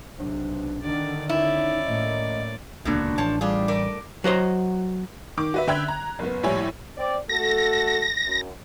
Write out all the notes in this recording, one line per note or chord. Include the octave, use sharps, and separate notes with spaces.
B1 C3 D4
D3 D#3 D4 D5
C#4 D#4 E4 D5
A2 A#3 D#5
D#1 C#2 B2 D3 F#3 A#3 D4
A1 F3 C#5 A5
G3 D4 F4 G#4
A3 A#4 D5
F#3 F#4 C5 D#5
D#3 D6
F#4 B4 E5
D3 E5 G5 B5 F#6 G#6
A#5
F#1 B3
A#1 A2 G3 E4 C#5 G#5
C4 D5
A3 F#4 A4 A#6
F#2